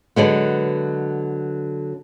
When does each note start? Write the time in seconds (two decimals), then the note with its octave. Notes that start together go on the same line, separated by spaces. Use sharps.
0.16 D3 F#3 G#3 B3